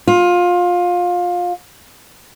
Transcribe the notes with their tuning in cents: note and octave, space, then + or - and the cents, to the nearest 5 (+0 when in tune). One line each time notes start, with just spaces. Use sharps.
F4 +20